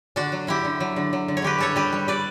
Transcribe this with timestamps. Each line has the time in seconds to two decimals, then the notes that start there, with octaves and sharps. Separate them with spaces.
0.16 D3 D4 F#4
0.32 F#3
0.47 D3 E4 G4
0.65 D3
0.80 F#3
0.96 D3
1.13 F#3
1.28 D3
1.37 C#5
1.42 D3 G4 B4
1.58 G3 A4 C#5
1.76 G3 G4 B4
1.93 G3
2.08 G3 B4 D5